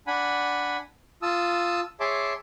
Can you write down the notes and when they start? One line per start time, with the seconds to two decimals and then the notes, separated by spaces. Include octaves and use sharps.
0.07 D4 F#5 G#5 B5
1.22 F4 A5 D#6 E6
2.00 G#4 C#5 E5 A5 C6 D6